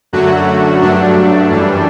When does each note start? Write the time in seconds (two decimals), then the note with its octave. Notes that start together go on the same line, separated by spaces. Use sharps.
0.13 F#2 D3 F#3 A3 F#4
0.81 G2 F#3 A3 D4
1.51 F#2 E3 G3